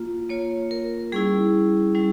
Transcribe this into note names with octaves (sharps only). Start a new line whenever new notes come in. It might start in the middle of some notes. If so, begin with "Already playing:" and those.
Already playing: A#3 F4
A#3 F4 C#5
A#4
G3 C#4 E4 G#4
G3 C#4 E4